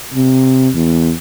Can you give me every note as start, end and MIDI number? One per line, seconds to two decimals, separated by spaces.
0.14 0.69 48
0.75 1.12 40